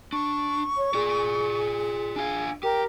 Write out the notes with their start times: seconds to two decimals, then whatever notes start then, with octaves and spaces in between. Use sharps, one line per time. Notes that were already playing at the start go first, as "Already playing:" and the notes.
0.13 D4 C#6
0.77 C#5
0.94 F4 G#4 D5
2.16 D4 F4 F5 G#5
2.63 G4 A#4 G5